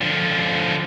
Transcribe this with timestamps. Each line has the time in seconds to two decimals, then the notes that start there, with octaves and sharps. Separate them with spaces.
0.01 D3 F3